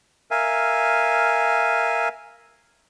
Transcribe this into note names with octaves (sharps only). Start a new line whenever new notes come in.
A#4 E5 F5 G#5